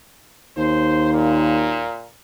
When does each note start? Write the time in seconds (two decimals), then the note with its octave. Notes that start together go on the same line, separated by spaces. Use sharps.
0.57 D#2 C5
1.13 A#2